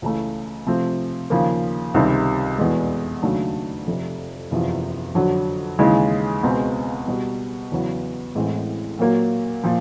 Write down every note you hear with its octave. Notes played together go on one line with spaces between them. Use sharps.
C#2 C#3 E3 A3
C3 F3 A3 C4
D#2 C#3 F3 A#3
C#2 C3 D#3 G3 C4
F1 E2 B2 G#3
D#2 C#3 F#3 A3 D4
F1 F2 C3
F#1 E2 C3 F3
F2 D3 F#3
D#2 C#3 E3 G#3
C#2 B2 G#3 C4
B2 G3 B3
E2 C#3 F#3 B3
A1 A2 E3 G#3 C4
A#2 F#3 A#3
A#2 F3